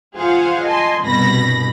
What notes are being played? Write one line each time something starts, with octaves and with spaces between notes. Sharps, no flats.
F4 G#4 C5 F5 F#5
D#5 G#5 A5 C6
C2 G2 B2 B5 A#6